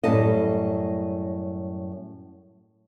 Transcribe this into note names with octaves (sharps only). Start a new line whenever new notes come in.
F#2 A2 G3 A4 D#5